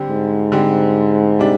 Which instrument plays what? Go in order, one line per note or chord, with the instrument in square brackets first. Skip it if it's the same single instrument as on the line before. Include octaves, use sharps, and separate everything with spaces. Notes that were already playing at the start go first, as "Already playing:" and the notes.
Already playing: [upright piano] D3 G3 C4
[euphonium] G#2
[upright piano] D3 G3 C4
C3 G3 D4